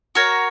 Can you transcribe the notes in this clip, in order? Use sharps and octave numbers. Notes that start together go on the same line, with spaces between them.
F#4 A#4 C#5